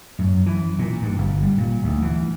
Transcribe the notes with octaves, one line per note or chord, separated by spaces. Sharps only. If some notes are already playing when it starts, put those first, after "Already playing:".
F#2
E3
A#2
G2
G1
G3
A#2
D2
E3